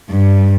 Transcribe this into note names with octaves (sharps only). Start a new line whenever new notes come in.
G2